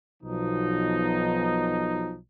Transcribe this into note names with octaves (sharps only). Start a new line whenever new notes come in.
B1 B2 F3 D#4